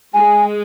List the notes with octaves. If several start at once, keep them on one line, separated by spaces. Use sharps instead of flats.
G#3 G#5